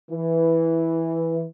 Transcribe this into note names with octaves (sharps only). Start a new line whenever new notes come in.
E3